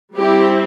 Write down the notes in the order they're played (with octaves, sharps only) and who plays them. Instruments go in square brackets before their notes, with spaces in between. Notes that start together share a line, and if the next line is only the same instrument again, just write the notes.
[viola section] G3 C4 E4 G4